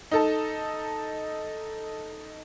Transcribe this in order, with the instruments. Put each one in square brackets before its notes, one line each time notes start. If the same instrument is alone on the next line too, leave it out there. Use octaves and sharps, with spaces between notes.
[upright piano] D#4 A4 A5